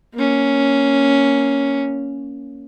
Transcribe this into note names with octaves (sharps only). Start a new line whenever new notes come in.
A#3 C#4